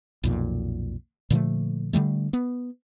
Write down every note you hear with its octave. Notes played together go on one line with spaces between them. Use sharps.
B1 F2 A#2
A#2 D3 F3 A3
D3 E3 G3 A3
B3